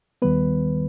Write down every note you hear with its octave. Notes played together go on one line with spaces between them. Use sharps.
D#2 D#3 G3 B3 B4